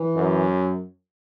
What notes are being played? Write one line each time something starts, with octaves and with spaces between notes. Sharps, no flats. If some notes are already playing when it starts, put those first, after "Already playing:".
Already playing: E3
F#2